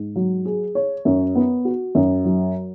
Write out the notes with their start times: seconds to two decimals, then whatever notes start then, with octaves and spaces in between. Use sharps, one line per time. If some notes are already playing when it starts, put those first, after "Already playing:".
Already playing: G#2
0.16 F#3
0.46 G#4
0.75 C#5
1.05 F#2
1.35 B3
1.65 F#4
1.95 F#2
2.25 F#3